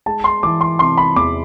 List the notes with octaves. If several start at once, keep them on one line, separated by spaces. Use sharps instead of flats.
G#3 A5
C6
E3 D6
C6
C3 C6
B5
E2 D6